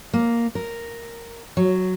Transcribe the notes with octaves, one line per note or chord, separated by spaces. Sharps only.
A#3
A#4
F#3